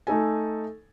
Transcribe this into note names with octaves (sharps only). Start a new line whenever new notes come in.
A3 D#4 A4 G#5